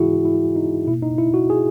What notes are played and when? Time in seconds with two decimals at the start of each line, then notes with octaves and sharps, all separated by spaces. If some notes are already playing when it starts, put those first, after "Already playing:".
Already playing: G#2 E3 G#3 E4 F#4 G#4
0.25 E4
0.56 D#4
0.87 B2 E4
0.91 A#3
1.03 D#4
1.18 E4
1.34 F#4
1.50 G#4